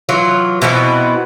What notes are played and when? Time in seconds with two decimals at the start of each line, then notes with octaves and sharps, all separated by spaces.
0.09 E3 F#3 F4
0.62 B2 E3 B3 C4